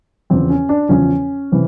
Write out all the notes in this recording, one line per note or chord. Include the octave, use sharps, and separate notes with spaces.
E2 C#3 F3 C4
C#4
D4
E2 C#3 F3 C#4
C3 E3